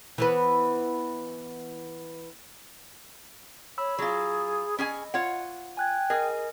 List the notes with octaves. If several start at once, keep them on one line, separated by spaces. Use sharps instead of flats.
E3 B3 B4
C#5 B5 E6
F#3 F4 G#4
C#4 G#4 D#5 G#5
F4 C#5 F#5
G5 G#5 F#6 G#6
G#4 A#4 D#5 G#5